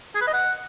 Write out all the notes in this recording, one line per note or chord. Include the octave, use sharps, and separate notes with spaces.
G#4
B4
D#5
F#5